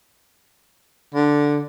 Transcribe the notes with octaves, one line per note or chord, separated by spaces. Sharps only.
D3